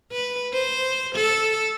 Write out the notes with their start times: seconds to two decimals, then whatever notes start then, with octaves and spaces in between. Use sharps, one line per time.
0.12 B4
0.53 C5
1.15 A4